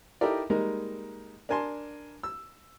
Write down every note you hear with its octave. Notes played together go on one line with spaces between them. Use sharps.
D#4 E4 G4 A4 A#4 D5
G3 G#3 A#3 D#4 A#4
D4 A#4 G#5 A5 C6
E6